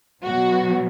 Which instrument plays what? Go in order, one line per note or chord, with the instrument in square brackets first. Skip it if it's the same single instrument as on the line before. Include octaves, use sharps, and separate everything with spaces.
[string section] B2 F#3 F#4